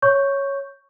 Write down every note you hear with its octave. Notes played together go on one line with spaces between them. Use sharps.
C#5 C#6 G6